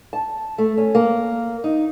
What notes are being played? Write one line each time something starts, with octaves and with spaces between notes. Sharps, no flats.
A5
A3
C#4
A#3
D#4